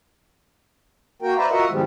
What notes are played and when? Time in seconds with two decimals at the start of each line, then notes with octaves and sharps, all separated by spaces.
1.22 A#3 F#4 A#4 G5
1.38 B4 C5 D5 E5 A#5
1.51 F4 F#4 A#4 D#5 E5 F#5
1.70 G#2 B2 D#3 F3 G3 G#3